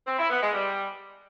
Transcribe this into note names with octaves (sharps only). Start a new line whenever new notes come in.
C4
E4
B3
G#3
G3